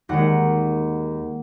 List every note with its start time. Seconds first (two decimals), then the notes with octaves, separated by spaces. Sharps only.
0.09 D#2 D#3 G#3 F#5